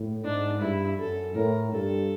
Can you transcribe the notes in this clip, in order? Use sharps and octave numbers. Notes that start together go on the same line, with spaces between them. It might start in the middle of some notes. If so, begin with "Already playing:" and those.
Already playing: A2
G#2 D4
G2 E4
F#2 A4
A2 A#4
G2 A4